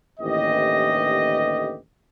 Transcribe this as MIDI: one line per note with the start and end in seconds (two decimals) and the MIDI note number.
0.20 1.77 33
0.20 1.77 39
0.20 1.77 50
0.20 1.77 52
0.20 1.77 67
0.20 1.77 75